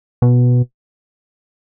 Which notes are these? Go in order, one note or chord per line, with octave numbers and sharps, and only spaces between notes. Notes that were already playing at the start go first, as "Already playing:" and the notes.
B2